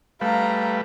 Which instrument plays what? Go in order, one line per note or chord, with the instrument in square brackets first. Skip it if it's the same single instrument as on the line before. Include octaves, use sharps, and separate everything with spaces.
[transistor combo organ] G3 A3 B4 [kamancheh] F5 A#5